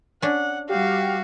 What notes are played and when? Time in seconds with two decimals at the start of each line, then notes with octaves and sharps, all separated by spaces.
0.22 C#4 D4 F#5
0.69 G3 F#4 G4 F5